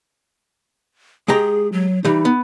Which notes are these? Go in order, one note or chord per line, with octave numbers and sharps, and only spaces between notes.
G#3 G4 G#4 A#5
F#3
E3 G3 D#4
B3